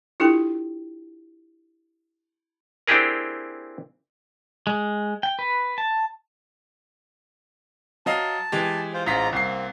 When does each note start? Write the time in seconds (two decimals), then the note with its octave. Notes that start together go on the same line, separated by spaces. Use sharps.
0.20 D4 E4 F4 G4 A4 G5
2.88 C4 D4 E4 G4 G#4 A#4
4.67 G#3
5.23 G5
5.39 B4
5.78 A5
8.06 F#3 D#5 F5 A5
8.52 E3 G#3 G4
8.94 F4 C5
9.06 A1 G#2 F4 A#5 B6
9.33 C2 A#3 C4 C7